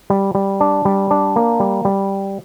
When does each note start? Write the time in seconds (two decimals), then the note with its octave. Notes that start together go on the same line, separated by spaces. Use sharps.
0.10 G3
0.35 G3
0.60 D4
0.85 G3
1.11 D4
1.36 A#3
1.60 G3
1.85 G3